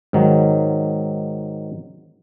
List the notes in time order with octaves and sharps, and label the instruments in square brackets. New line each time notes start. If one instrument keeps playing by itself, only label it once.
[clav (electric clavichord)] G#2 D#3 F#3